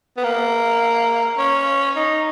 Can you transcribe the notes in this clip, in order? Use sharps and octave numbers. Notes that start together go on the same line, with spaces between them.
B3
A#3
C#4
D#4